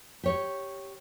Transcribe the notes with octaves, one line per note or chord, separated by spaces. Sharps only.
G4 C#5